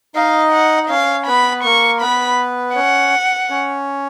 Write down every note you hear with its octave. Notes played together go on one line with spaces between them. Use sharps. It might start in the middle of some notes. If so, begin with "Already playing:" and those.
D#4 D#5 F5
F#5
D#5
C#4 C#5 F5
B3 B4 B5
A#3 A#4 C#6
B3 B4 B5
C#4 C#5 F#5
C#4 C#5